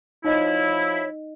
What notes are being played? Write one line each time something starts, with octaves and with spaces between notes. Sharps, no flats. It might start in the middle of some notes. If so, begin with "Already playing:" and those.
F3 D#4 E4 C#5 D#5